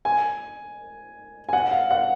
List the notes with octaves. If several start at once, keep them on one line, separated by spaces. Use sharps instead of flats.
G#5
G#5
F#5
F5
F#5